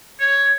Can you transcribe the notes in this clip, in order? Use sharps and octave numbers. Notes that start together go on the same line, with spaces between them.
C#5